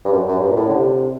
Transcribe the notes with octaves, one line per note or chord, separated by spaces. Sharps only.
G2
F#2
F#2
G2
A#2
A2
D3
C3